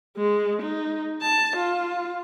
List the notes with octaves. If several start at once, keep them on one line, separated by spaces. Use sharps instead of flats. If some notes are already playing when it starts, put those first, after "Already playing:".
G#3
D#4
A5
F4